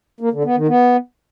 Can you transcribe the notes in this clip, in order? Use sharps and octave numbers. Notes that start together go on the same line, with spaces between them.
A#3
D3
B3
D#3
B3